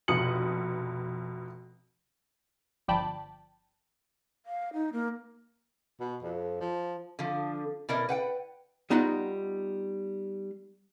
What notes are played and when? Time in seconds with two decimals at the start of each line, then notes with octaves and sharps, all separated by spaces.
0.08 F1 B2 D#6 C#7 F#7
2.88 G1 F3 D5 G5 A5 B5
4.46 F5
4.73 D#4
4.93 A#3
6.00 B2
6.22 F2
6.60 F3
7.19 D3 F3
7.89 B2 E4 A#4 D5 D#5
8.09 B4 F#5 G5
8.90 G3 B3 D#4 F4 D#5 F#5